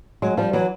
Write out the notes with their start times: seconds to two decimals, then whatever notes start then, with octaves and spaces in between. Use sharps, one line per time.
0.22 F#3 G#3
0.37 F3 G3
0.53 E3 F#3